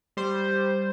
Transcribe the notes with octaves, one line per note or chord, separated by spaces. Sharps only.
G3 C5
G3